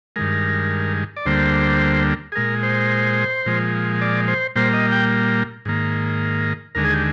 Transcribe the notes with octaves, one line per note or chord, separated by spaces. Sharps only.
G2 D#3 G#3 A#4
D5
D2 D3 G3 A#3 C5
G#4
A#2 G#3 A#4
C5
A#2 F3 G#3
D5
C5
A#2 G3 A#3 C5
D#5
G5
G#2 D#3 A#3
D#2 D3 G#3 A#4
G#4
G4